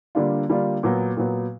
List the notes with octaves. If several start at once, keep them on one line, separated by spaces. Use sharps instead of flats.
D3 G3 A#3 D4 F4
D3 G3 A#3 D4 F4
A#2 F#3 B3
A#2 F#3 B3